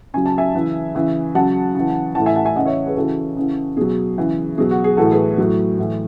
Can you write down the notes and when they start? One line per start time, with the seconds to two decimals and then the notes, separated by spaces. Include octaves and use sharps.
0.14 C#3 F#3 G#5
0.26 A5
0.38 E5 G#5
0.54 C#3 E3
0.95 C#3 E3
1.35 C#3 F#3 F#5 A5
1.75 C#3 E3
2.15 A2 E3 F#5 A5
2.26 E5 G#5
2.36 F#5 A5
2.45 E5 G#5
2.56 C#3 E3 D#5 F#5
2.65 C#5 E5
2.87 G#4 B4
2.96 C#3 E3 F#4 A4
3.37 C#3 E3
3.77 B2 F#3 G#4
4.18 C#3 E3
4.58 B2 F#3 G#4
4.71 F#4
4.84 G#4
4.97 A2 E3 F#4 A4
5.11 G#4 B4
5.38 A2 F#3
5.78 A2 E3